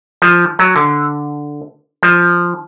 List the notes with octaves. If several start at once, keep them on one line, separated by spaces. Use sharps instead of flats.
F3
F#3
D3
F3